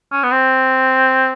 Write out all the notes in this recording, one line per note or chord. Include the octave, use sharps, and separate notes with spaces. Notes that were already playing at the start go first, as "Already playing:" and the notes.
C#4
B3
C4